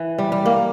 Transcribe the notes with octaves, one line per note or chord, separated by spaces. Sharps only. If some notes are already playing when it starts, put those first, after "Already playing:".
Already playing: E3
G3
G3
A#3